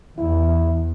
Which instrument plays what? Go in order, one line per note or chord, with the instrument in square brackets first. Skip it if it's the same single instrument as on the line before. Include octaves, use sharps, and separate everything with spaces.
[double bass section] E2 [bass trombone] E4